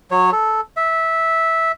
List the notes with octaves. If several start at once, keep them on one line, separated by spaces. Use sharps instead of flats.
F#3 C#5
A4
E5